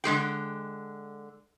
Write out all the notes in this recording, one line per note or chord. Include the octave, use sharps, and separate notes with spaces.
D3 G#3 G#4 G5